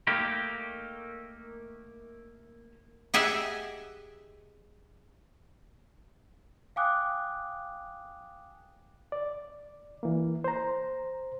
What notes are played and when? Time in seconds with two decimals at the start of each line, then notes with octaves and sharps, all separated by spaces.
0.07 A3 A#3 D#4 G4
3.14 G4 G#4 D#5 E5 F#5 G#5
6.76 F5 G5 G#5 D6 D#6 F#6
9.12 D5
10.03 E3 A#3
10.44 C5 A#5